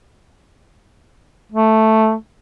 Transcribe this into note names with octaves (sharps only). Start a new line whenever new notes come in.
A3